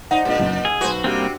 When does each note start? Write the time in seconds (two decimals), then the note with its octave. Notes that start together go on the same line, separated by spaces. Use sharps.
0.11 D#4 C5 D5 F#5
0.25 A#2 G#3 D4 F4
0.39 F#1 F#2
0.65 G#4 G#5 E6 G#6
0.81 B1 F#4 B4 C5
1.04 C3 G3 A#3 C4 D4 F#4 G4